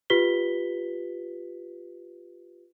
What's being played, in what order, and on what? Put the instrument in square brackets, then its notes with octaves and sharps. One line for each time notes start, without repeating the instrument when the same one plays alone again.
[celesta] F4 G4 B4 B6 G7